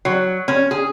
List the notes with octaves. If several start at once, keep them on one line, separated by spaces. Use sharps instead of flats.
F#3
C#4
G#4